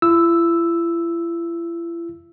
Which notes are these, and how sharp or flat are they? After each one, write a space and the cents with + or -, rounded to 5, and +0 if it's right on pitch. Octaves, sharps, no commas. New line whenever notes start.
E4 +40 E6 +0